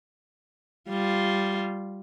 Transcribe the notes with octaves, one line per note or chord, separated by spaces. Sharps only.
G3 F4